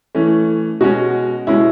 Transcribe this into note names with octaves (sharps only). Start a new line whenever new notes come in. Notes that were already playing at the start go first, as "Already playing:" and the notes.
E3 A3 C#4
B2 G#3 C#4 F#4
B2 G#3 C#4 E4